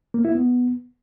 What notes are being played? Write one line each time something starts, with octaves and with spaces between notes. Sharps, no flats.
A#3
E4
B3